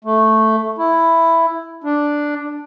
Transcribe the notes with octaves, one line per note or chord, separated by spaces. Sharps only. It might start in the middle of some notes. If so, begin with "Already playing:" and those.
A3
E4
D4